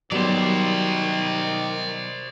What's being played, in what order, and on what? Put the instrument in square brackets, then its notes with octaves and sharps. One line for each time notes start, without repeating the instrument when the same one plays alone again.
[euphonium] D#3 [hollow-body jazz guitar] F#3 B3 [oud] G3 [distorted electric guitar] C5 D5